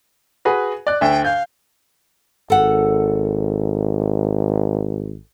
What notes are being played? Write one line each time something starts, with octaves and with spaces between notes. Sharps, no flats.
F#4 G#4 B4
D5 F#6
D2 E5 G5
F5 G6
G#1 A4 F#5